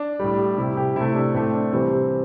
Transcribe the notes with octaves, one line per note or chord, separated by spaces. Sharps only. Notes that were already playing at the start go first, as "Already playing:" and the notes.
Already playing: D4
A2 G3
C3 G3 E4
G4
C3 A3 E4
D4
A2 A3 C4
D4
C3 E3 G3 C4